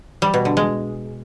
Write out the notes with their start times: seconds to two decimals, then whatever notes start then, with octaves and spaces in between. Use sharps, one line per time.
0.22 G3
0.34 B2
0.45 D3
0.57 G#3